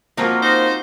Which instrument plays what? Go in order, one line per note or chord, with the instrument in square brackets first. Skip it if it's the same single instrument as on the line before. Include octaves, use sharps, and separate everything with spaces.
[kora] F3 F#4 D#5 [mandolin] A#3 C4 A#4
[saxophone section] D#4 [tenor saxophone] C5